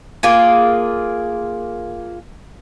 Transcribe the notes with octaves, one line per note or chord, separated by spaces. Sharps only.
A#3 F4 G#4